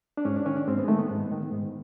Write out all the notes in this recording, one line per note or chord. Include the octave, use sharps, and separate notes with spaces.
D4
G#2 C#4
D4
D#3 C#4
D4
G#2 C4
B3
G#3
D#3 A3
B3
G#2
D#3
G#2